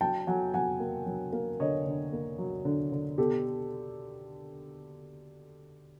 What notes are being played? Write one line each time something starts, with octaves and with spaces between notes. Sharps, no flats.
F#3 G5 A5
F#3 F#5 G#5
F#3 F#5 G#5
A#3
F#3
A#3
D3 C#5 D#5
D3
A#3
F#3
D3
D3
B2 G4 A4